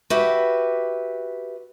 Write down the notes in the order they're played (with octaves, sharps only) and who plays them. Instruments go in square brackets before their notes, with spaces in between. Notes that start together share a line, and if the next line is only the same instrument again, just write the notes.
[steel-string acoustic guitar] F#4 G4 B4 E5